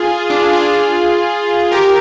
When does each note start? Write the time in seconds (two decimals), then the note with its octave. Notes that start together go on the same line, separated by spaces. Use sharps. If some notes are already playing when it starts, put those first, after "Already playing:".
Already playing: F4 G#4
0.30 D4 F4
0.53 F4 G#4
1.72 G4 A#4